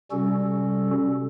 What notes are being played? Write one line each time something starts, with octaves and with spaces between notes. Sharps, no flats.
C3 G3 C#4 F#4 A4